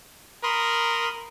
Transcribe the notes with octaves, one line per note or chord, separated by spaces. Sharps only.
A#4 B5 C6 D#6